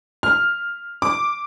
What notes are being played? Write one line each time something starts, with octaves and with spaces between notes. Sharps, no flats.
F6
D6